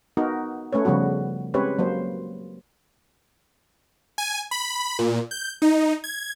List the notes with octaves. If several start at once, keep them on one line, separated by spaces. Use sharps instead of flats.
B3 D#4 F#4 A#4
A3 C#4 B4 C#5
C#3 F3 G3 B3 F#4
G#3 C4 C#4 G4 B4 C#5
F#3 A#3 C5
G#5
B5
A#2
G6
D#4
G#6